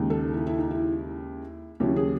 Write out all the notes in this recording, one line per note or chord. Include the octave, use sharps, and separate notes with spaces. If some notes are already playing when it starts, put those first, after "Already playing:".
Already playing: D#2 C#3 G#3 D#4
A4
E4
E4
D#4
E4
D#2 C#3 F#3 E4
G#4